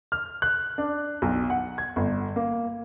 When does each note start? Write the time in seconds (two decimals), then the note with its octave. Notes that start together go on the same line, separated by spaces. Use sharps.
0.12 F6
0.42 F#6
0.78 D4
1.22 B1
1.50 F#5
1.78 G#6
1.96 G1
2.36 A#3